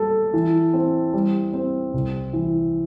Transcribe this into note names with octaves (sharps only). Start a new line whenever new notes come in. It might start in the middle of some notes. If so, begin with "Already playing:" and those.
Already playing: G3 A4
E3
C4
G3
C4
C2
E3